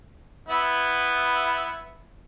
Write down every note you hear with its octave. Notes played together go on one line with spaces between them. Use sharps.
B3 E4